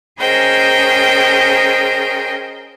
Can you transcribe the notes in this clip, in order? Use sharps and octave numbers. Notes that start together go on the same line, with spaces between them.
C#4 G#4 A#4 C5 D#5 G5